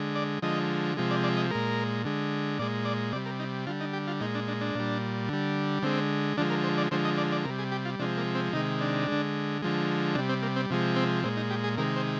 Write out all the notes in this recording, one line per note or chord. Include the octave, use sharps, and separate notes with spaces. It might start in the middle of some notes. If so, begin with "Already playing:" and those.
Already playing: D3 G#3
D5
D3 F3 G#3 D#5
C3 F3 G#3
D5
D5
D#5
A#2 G#3 A#4
D3 G#3
A#2 G#3 D5
D5
C3 G3 D5
A#4
D#4
D3 G3 F4
D#4
G4
F4
A#2 G#3 D#4
D4
D4
D4
A#2 G3
D3 G3
D3 G#3 C4
D3 F3 G#3 D4
A#4
C5
D5
D3 F3 G#3 C5
D#5
D5
D5
C3 G3 A#4
G#4
G4
F4
C3 F3 G#3 D4
A#3
C4
C3 D#3 G#3 D#4
D4
D3 G#3
D3 F3 G#3
C3 G3 D4
C4
A#3
C4
C3 F3 G#3
C4
A#2 G#3 C4
D#4
G4
G#4
C3 D#3 G#3 A#4
C5